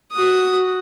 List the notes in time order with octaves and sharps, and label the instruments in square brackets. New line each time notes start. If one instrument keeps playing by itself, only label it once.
[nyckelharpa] F#4 D#6